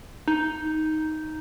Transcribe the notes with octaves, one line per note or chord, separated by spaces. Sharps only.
D#4